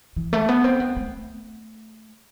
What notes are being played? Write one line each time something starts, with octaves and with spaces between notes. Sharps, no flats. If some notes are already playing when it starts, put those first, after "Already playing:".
E3
A3
B3
C4
B3
A3